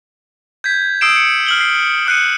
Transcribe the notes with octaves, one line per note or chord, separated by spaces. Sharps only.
G6 G#6 B6
D#6 E6 C7 D7 E7
C#7
F6 F#7 G7
C7
D#6 F#6 C7 C#7 D#7